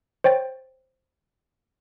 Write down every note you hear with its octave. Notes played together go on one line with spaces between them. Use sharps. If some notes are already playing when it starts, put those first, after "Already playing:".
C5 C#5 G5 A6